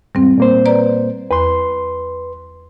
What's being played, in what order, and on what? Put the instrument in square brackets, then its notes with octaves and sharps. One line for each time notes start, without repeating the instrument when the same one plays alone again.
[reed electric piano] E2 G#2 [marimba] G3 C4
[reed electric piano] A#2 A#3 C5
[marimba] B4 D5 A#5
[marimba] E2 [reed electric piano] B4 C6